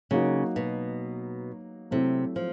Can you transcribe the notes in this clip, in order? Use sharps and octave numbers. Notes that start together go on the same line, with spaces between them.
C#3 F#3 A#3 D#4 F#4
B2
C3 F#3 A3 C4 E4
F3